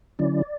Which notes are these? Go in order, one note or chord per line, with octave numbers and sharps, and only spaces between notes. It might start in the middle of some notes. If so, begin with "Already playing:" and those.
D3 F#3 C#4 E4 D5